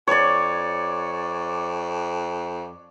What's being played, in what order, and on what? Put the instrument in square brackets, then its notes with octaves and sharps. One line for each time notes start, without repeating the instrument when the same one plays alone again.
[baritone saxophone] F2 [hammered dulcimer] C#5 D5